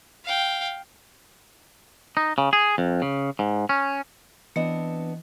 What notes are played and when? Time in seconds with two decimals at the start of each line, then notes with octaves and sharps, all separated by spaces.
0.25 F5 G5
2.17 D#4
2.38 C#3
2.53 G#4
2.78 F2
3.02 C#3
3.39 G#2
3.69 C#4
4.56 E3 B3 C4 D4 D#5 C#7